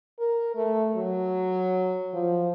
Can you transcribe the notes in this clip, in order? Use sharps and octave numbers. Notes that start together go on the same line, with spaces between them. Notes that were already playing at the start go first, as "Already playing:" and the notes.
A#4
A3
F#3
F3